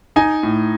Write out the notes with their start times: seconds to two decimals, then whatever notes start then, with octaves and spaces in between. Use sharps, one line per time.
0.16 D#4 G#5
0.43 A2